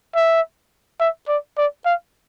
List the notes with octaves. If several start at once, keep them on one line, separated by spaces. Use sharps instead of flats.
E5
E5
D5
D5
F5